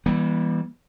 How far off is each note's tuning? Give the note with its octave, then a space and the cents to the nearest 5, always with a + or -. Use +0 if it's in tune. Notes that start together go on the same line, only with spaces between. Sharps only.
E3 +0 G3 +30 B3 -40